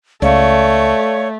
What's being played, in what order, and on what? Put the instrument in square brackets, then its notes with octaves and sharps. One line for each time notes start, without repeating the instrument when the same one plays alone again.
[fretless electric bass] C#2 [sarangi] A3 [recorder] C#5 [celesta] D5 F5